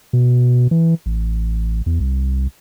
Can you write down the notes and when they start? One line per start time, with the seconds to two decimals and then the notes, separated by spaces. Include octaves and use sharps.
0.13 B2
0.71 E3
1.06 A1
1.86 E2
2.00 C2